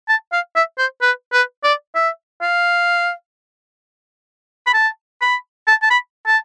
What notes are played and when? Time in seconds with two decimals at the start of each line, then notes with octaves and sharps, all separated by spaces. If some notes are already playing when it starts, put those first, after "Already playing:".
0.09 A5
0.33 F5
0.56 E5
0.79 C5
1.02 B4
1.33 B4
1.64 D5
1.95 E5
2.42 F5
4.67 B5
4.74 A5
5.22 B5
5.67 A5
5.82 A5
5.91 B5
6.27 A5